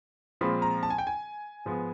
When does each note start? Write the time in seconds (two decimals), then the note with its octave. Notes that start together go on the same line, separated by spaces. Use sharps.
0.41 A#2 F3 G#3 C4 B5
0.62 A#5
0.83 A5
0.90 G#5
0.98 G5
1.07 G#5
1.65 G#2 F3 G#3 B3